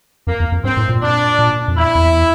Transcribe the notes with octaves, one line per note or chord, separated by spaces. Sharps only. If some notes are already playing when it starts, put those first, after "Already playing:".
F2 A#3
E2
F2
G2 C4
A2
A#2
D4
A#2
F2
E2 E4
E2